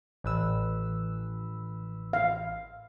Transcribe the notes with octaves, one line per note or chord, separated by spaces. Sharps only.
A1 B4 E6
F5